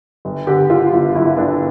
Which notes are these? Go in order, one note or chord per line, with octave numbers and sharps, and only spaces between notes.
G1
D3 G4
D3 F4
G1 F4
G1 E4
G1 D4